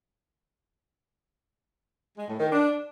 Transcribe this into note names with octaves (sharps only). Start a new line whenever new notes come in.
G#3
A2
D#3
D4